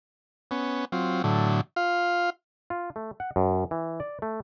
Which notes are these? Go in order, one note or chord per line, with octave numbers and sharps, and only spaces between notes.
B3 C#4
F#3 C4 F4
A2 D3 F#3
F4 F5
F4
A3
F#5
F#2
E3
D5
A3